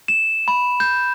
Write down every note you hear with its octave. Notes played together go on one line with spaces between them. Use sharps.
E7
B5
G6